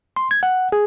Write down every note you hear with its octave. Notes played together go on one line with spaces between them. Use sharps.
C6
G#6
F#5
G#4